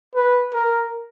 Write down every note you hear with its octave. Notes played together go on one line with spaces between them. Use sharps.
B4
A#4